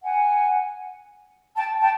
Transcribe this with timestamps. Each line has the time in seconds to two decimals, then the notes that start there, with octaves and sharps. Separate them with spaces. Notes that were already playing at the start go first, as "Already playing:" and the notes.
0.03 F#5 G#5
1.56 G5 A5
1.81 G5 A5